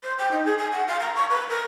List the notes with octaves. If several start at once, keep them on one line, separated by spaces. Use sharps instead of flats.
C5
G5
D#4
G#4
G#5
F#5
F5
A#5
C#6
B4
A#4